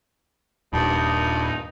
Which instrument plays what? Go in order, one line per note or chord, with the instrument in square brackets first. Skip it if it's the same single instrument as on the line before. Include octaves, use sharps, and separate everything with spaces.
[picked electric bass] D#1 [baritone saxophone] G2 [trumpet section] D#4